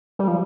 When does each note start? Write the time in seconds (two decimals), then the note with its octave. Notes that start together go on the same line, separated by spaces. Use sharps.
0.19 G3
0.28 F3